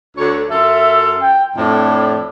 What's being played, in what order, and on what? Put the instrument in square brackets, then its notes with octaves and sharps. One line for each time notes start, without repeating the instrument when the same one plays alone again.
[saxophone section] D2 D3 C#5
[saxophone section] F#2 F4 A4 [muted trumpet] E5
[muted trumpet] G5
[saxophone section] F2 A2 [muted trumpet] D4